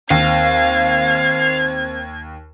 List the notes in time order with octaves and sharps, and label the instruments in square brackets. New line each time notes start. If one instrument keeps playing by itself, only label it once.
[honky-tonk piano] D#2 [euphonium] C4 [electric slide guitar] F5 [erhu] G#6